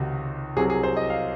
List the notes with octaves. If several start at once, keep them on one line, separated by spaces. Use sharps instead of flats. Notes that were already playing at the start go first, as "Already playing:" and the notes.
Already playing: C#2 C3 D#3 F#4
C2 C3 F#3 G#4
G#4
C5
D#5
F5